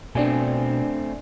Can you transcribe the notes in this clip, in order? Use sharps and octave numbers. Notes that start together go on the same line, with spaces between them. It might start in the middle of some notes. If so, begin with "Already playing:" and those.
B2 A3 C4 D4 D5 G#5